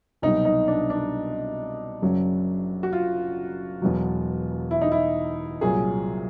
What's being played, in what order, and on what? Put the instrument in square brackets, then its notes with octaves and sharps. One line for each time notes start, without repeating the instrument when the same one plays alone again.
[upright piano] C2 B2 F#3 D#4
D#4
D4
D4
F#1 F#2 C#3 F#3
F#4
F4
E1 E2 B2 F#3
E4
D#4
E4
C2 A#2 F#3 G#4